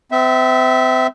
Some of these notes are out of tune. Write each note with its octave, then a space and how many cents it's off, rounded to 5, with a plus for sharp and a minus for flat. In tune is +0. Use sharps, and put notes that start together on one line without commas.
C4 -35 E5 -10